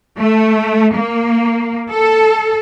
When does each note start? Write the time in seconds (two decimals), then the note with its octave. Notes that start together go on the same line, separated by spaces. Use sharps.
0.18 A3
0.95 A#3
1.91 A4